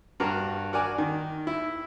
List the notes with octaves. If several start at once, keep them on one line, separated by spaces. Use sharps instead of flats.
G2 F#4 A#4 A#5
F#4 A#4 D5 G#5
D#3
E4